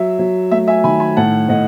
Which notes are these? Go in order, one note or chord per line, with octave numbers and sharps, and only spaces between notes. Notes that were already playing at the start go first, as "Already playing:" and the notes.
Already playing: F#3 E5
F#3
A3 E5
E5 G#5
D#3 G#5 B5
G#5 B5
A2 F#5 A5
A2 D#5 F#5